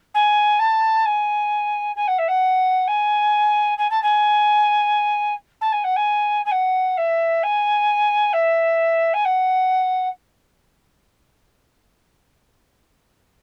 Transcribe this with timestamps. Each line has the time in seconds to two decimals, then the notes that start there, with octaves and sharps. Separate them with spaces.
0.14 G#5
0.59 A5
1.05 G#5
1.95 G#5
2.07 F#5
2.18 E5
2.28 F#5
2.87 G#5
3.78 G#5
3.90 A5
4.02 G#5
5.61 A5
5.72 G#5
5.83 F#5
5.96 G#5
6.45 G#5
6.51 F#5
6.97 E5
7.43 G#5
8.33 E5
9.13 G#5
9.24 F#5